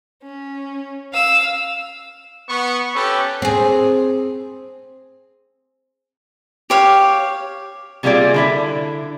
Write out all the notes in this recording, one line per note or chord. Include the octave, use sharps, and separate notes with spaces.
C#4
F5 E6
B3 C#6
C#4 G4 A4 B4
C4 G#4
G4 C#5 F5
C3 G3 A#3 F4 G#4 D5
D3 E4 E5